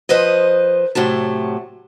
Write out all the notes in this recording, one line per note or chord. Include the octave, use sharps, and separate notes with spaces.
F3 B4 C5 D#5
A2 C3 F#3 A5